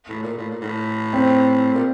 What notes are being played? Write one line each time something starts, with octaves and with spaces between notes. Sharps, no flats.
A2
A#2
A2
A#2
A2
C4
A#2